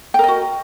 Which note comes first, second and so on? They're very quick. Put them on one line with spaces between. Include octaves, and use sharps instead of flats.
G5 A#4 D#5 F#4